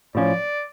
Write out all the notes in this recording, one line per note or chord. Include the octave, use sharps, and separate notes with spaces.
A2 F3 C#4 D5